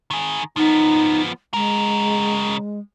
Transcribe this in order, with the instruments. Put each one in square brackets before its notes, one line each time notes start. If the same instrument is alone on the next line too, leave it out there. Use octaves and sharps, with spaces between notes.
[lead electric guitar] D#3 G#4
[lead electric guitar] F3 B3 [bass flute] D#4
[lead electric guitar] C#3 A#4 [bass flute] G#3